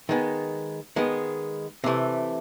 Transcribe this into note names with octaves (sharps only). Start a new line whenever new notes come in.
D#3 G#3 B3
D#3 G#3 B3
C3 E3 A3